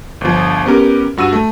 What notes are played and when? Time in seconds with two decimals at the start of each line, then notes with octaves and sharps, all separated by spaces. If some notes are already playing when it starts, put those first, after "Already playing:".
0.21 G1 F3
0.66 B3 C#4 G4 A#4
1.17 G2 F#4 E6 D#7
1.33 A3